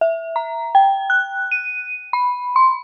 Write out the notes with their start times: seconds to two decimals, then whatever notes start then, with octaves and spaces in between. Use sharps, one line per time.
0.01 E5
0.36 A#5
0.75 G5
1.10 F#6
1.52 D#7
2.13 B5
2.56 C6